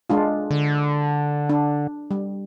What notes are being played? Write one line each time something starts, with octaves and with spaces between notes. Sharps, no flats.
G#3 D4 F4
D3
D4
G3